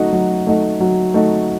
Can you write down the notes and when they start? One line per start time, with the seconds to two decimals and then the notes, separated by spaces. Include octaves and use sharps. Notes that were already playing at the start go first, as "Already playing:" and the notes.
Already playing: F#3 A3 D#4 F#4
0.13 F#3
0.47 A3 D#4 F#4
0.81 F#3
1.14 A3 D#4 F#4